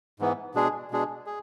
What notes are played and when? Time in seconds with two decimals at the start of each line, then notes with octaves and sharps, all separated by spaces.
0.20 G#2 E3 B3
0.55 B2 G#3 D4 G#4
0.91 B2 G#3 D4 G#4
1.27 G#4